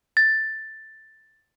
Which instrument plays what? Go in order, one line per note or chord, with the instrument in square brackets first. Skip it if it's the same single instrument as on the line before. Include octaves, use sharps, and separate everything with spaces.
[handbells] A6